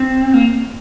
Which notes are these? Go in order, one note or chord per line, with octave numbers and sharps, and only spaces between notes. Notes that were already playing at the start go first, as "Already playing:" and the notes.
Already playing: C4
A#3